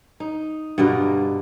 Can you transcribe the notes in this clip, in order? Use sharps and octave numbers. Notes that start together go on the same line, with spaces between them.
D#4
G2 B2 D3 A#4